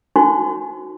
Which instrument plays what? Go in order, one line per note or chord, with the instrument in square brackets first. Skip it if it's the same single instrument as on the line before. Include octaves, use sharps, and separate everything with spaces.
[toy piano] D#4 F#4 C5 G#5 C6